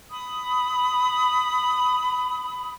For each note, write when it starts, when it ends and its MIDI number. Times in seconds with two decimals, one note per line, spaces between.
0.10 2.72 83
0.10 2.72 87